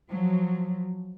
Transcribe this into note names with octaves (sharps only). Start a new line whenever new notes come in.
F3 F#3